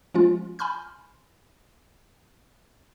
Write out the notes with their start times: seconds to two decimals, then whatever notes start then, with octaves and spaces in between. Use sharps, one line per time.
0.14 F3 G#3 C#4 F4
0.59 G#5 B5 C6 F6 G6